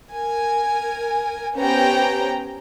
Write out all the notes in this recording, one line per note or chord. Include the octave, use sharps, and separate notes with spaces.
A#4 G#5
B3 C#4 G4 C5 G5 A#5